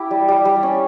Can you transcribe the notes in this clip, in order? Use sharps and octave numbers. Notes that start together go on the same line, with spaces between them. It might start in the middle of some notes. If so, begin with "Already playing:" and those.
Already playing: E4 G4
G3
G3
G3
C#4